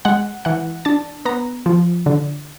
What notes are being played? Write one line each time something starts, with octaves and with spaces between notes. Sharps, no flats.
G#3 F#5
E3 F#5
D4 A5
B3 A#5
F3
D3